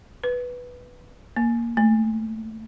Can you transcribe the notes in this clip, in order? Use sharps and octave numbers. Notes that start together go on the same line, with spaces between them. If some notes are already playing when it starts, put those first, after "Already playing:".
B4
A#3
A3